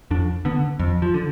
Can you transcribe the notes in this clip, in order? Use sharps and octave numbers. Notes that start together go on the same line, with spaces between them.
F2 D4
D3 B3
F2
F3
D3